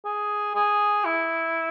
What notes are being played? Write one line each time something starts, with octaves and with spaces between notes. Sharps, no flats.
G#4
G#4
E4